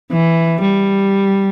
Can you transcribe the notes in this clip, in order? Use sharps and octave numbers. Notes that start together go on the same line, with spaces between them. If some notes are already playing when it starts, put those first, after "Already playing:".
E3
G3